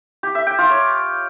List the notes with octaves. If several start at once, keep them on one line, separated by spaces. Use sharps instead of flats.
G4
E5
G5
F4
C#5